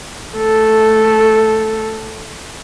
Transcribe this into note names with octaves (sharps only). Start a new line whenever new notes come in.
A3 A4